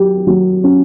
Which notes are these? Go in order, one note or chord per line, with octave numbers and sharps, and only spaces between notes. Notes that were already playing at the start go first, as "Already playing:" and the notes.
Already playing: F#3 G4
F#3
C#4